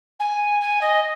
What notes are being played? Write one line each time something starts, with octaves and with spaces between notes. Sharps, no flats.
G#5
G#5
D#5